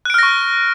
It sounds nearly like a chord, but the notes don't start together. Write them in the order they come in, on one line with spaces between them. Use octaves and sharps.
F#6 D7 F6 A#6 C#6